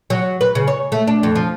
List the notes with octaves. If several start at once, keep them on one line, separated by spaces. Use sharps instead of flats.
F#3
B4
C#3
C#5
A3
D4
F2
F3